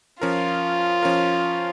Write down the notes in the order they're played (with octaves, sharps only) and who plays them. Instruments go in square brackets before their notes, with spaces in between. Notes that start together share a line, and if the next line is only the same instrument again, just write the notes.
[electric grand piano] F3 C#4 A#4 [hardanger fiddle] F4
[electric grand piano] F3 C#4 A#4